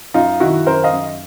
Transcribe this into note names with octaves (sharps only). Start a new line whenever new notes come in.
F#2 D#4 F4
D#3 E4 F#4
F#2 A#4 C5
D#5 F5
F#2